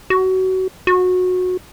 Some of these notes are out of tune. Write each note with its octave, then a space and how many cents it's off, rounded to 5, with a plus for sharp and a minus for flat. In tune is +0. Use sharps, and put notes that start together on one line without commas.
F#4 +25
F#4 -20